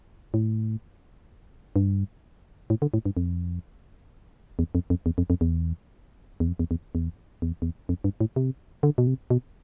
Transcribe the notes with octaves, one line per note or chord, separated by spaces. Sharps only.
A2
G2
A2
D3
A2
G2
F2
E2
F2
F2
E2
F2
F2
E2
E2
F2
E2
E2
E2
E2
E2
F2
G2
A2
C3
D3
B2
C3
B2